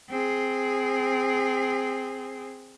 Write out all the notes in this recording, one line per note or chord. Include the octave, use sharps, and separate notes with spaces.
C4 G#4